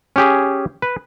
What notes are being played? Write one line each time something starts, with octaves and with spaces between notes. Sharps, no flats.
C#4 G4 G#4
B4